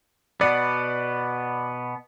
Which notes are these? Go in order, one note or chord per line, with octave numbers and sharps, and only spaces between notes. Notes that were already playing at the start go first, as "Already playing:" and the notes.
B2 B3 D5